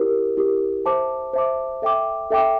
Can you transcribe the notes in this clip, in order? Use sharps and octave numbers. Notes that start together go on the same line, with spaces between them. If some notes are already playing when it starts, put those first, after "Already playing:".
Already playing: E4 G4 A#4
E4 G4 A#4
C5 E5 A5 D6
C5 E5 A5 D6
A4 E5 G5 D6
A4 E5 G5 D6